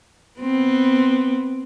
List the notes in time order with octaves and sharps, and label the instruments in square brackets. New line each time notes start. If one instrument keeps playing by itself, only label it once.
[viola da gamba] B3 C4